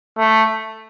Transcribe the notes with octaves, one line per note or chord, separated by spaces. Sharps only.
A3